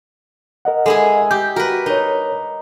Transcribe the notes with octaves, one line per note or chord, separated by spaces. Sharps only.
A#4 D#5 F#5
G#3 E4 G#4 A4
G4 G6
F#4 A#4 B4
D#4 A#4 C#5